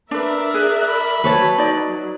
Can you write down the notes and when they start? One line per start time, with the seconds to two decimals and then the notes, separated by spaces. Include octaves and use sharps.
0.11 D4 A#4 B4 D5 E5
0.54 G#4 F#6
0.87 B5
1.24 F#3 B4 C#5 A5
1.58 D#4 D5